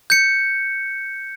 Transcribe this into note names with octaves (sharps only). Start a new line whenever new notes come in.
G6 C#7